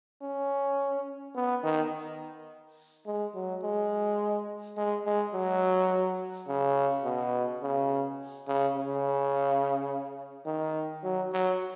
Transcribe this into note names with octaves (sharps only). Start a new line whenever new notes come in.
C#4
B3
D#3
G#3
F#3
G#3
G#3
G#3
F#3
C#3
B2
C#3
C#3
C#3
D#3
F#3
F#3